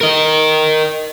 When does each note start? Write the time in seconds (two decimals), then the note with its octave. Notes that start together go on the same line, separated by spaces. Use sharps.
0.01 A#4 D#5